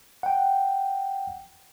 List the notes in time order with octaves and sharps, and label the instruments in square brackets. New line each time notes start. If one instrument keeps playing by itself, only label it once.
[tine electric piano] F#5 G5